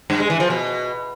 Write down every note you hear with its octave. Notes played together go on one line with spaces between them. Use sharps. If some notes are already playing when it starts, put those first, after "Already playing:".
G2
G#3
E3
F3
B2